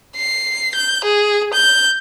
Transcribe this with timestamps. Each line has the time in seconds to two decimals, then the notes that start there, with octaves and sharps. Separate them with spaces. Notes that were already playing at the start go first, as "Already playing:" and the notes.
0.16 C7
0.75 G6
1.05 G#4
1.53 G6